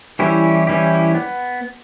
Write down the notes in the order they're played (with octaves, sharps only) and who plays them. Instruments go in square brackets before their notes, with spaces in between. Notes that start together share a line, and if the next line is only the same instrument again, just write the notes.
[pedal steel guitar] E3 G3 C#4 E4 G4
E3 G3 C#4 E4 G4
B3